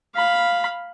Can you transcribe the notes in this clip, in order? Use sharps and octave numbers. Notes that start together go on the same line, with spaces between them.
F5 B5